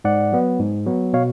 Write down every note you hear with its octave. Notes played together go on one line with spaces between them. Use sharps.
G#2 D5 F#5
F#3 B3
G#2
F#3 B3
B2 C#5 F5